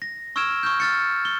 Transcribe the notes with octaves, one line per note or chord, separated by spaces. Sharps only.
A#6
C#6 E6 F6 G#6 D7 E7
C#6 F6 G6
F6 A6 C#7
G7